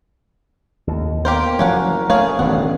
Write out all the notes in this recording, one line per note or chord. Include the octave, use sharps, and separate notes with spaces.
D#2 A2
A#3 B3 G4 A#4 C5
F#1 F3 F#3 A3 C#4 A#4 F5 F#5
A3 G#4 C#5 F5
E1 A1 G2 D#3 B3 F#5